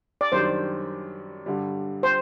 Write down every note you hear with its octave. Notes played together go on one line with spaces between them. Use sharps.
D5
F#2 D#3 G3 D4 C5
G2 D3 G3
C5